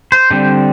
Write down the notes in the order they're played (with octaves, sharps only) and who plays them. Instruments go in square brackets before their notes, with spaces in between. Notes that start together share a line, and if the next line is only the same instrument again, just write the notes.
[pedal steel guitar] C5
D3 G3 C4